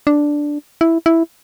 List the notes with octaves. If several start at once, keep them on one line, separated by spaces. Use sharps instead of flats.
D4
E4
E4